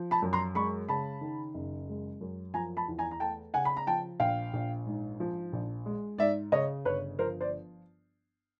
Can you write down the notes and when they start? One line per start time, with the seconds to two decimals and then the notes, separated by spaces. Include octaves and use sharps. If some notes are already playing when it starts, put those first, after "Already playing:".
Already playing: F3
0.11 A5 B5
0.22 F#2
0.33 A#5 C6
0.55 G#3 B5 C#6
0.89 C#3 A5 B5
1.21 D#3
1.54 F#1
1.89 G#3
2.21 F#2
2.54 F3 G#5 A#5
2.77 A5 B5
2.88 E2
2.99 G#5 A#5
3.11 A#5
3.20 A3 G5 A5
3.54 C#3 F#5 G#5
3.65 B5
3.77 A#5
3.87 F3 G5 A5
4.20 A#1 F5 G5
4.53 A#1
4.86 G#2
5.20 F3
5.53 A#1
5.86 G#3
6.18 G#2 D5 E5
6.52 C#3 C#5 D#5
6.85 G1 B4 C#5
7.19 F3 A#4 C5
7.41 C5 D5